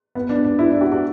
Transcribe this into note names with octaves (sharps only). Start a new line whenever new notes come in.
B3
D4
D4
E4
D4
F#4
F#4